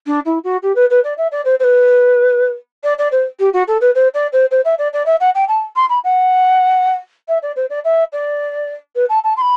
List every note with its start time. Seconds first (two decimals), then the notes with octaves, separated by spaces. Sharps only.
0.06 D4
0.25 E4
0.44 F#4
0.62 G4
0.75 B4
0.90 B4
1.04 D5
1.17 E5
1.31 D5
1.45 C5
1.59 C5
1.63 B4
2.83 D5
2.98 D5
3.11 C5
3.39 G4
3.53 F#4
3.67 A4
3.81 B4
3.95 C5
4.14 D5
4.32 C5
4.51 C5
4.65 E5
4.78 D5
4.93 D5
5.06 E5
5.20 F#5
5.35 G5
5.48 A5
5.76 C6
5.89 B5
6.04 F#5
7.28 E5
7.42 D5
7.56 C5
7.70 D5
7.84 E5
8.12 D5
8.95 B4
9.09 A5
9.24 A5
9.36 C6
9.41 B5